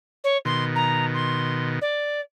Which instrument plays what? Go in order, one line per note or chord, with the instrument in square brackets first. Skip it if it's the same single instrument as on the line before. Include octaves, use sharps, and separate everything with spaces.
[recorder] C#5
[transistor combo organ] B2 D#3 [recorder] C6
[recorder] A#5
C6
D5